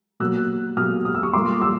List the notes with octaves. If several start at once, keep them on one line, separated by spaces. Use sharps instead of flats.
B2 F#3 A#3 E6 F#6
B2 F#3 A#3 D#6 F6
D#6
E6
C#6 D#6
A#2 G3 A#3 C6 D6
D6 E6